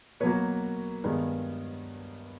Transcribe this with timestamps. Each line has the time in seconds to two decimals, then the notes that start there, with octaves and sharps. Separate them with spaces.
0.20 B2 F#3 A#3 B4 C#5
1.04 G2 D#3 G#3 B3